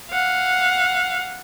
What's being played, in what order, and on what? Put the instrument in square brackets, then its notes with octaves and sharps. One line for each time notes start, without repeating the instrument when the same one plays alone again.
[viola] F5 F#5